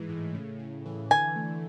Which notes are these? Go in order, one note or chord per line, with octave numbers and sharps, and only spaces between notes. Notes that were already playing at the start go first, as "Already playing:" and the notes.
Already playing: G#2 E3 G#3
A2
C#3
C#3
E3
D3 G#5
A3